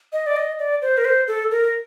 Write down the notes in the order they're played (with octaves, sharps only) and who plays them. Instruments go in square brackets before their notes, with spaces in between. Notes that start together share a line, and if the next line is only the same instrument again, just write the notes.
[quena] D#5
D5
D#5
D5
C5
A#4
C5
A4
A#4